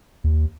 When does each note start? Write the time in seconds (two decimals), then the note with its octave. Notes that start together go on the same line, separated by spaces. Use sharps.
0.24 D#2